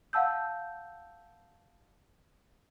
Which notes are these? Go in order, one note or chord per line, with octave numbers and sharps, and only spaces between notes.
F5 F#5 A5 E6 G6